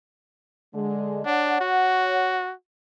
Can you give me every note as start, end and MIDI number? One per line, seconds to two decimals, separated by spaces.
0.74 1.24 50
0.74 1.24 56
1.26 1.58 62
1.26 2.45 73
1.26 2.45 78
1.61 2.54 66